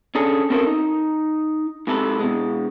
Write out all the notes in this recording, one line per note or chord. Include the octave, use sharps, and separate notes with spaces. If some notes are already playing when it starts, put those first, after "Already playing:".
C#4 D4 G#4 A4
C4 C#4 F#4 A4 A#4 C5
D#4
G#2 C3 A4 B4
B2 G#3